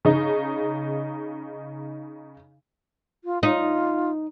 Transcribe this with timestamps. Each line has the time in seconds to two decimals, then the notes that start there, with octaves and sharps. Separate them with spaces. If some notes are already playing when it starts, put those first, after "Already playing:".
0.05 C#3 D#4
3.24 F4
3.43 D#4 F4